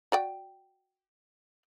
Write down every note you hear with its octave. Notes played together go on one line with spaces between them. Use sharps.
F#4 D5 G5